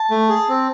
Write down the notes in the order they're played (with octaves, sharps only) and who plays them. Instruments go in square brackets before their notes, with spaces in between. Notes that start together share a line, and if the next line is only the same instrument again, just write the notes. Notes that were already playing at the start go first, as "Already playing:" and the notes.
Already playing: [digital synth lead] A5
[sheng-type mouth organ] A3
G#4
C4